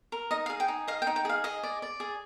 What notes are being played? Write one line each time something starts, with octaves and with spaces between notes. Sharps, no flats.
A#4
D#4 D#5
F5
G#4
G5
D#4
D#5 F5
G5
D#4
G5
G#4 F5
G#4 D#5
D5
D5
G#4